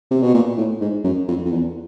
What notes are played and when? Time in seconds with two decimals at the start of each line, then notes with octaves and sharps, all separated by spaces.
0.11 C3
0.22 B2
0.34 A#2
0.57 A2
0.81 G#2
1.04 F#2
1.28 F2
1.45 F2
1.52 E2